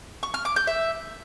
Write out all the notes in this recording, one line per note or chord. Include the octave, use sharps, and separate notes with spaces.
C#6
F6
D6
G6
E5